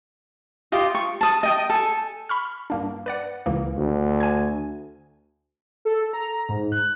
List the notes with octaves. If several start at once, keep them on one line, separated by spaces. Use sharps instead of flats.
F4 G4 D#5
C#6
A5 D#6
D#5 G5 D#6
A4 G#5
B5 C#6 F6
G2 A#3 D4
B4 D5 F#5
C#2 E3 A#3
D2
G#5 G#6
A4
A#5
G#2
F#6